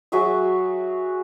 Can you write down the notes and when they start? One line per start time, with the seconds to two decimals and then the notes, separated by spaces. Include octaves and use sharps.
0.12 F#3 F#4 G#4 E5